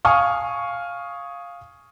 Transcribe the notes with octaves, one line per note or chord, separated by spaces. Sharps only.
F5 G#5 C#6 D#6 F6